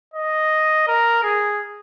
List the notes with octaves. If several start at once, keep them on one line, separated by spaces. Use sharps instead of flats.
D#5
A#4
G#4